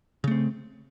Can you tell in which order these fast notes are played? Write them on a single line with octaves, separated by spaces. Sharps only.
C#3 A3 C4